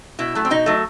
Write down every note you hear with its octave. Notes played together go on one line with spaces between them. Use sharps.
B2 E4
F#3 A3
C4
B2 D#4
F#3 A3